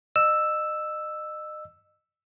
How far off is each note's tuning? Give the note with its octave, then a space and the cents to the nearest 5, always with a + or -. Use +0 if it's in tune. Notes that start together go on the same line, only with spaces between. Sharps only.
D#5 -30 E6 +0